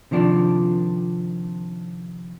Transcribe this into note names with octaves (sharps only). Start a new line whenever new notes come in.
C3 D#3 F3 D4